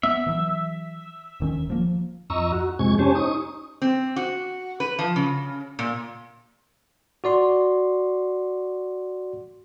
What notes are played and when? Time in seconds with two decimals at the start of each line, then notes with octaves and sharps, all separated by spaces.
0.03 B3 E5
0.27 E3 F#3
1.40 D#1 D#3 C#4
1.70 F3 A#3
2.30 F2 D#5 A#5 C#6 E6
2.52 F#4
2.79 F2 C3 G#3 C#6 G#6
2.99 C#4 G4 C5 C#5 G#5 A5
3.15 D#4 C#6 D#6
3.82 C4
4.16 F#4
4.80 B4
4.99 F3
5.16 C#3
5.79 A#2
7.24 F#4 D5 C6